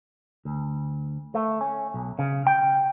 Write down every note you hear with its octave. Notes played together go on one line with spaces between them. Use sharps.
D2
A3
C#4
B1
C#3
G5